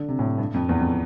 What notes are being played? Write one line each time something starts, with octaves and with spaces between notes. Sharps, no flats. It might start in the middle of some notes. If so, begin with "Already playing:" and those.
Already playing: D3
C3
A2
G2
F2
E2
F2